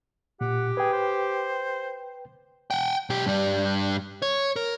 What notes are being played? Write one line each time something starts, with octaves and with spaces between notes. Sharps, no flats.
A#2 G4 F#5
G#4 B4 G5
C5
F#5 G5
B1 G4
G2 G3
C#5
A#4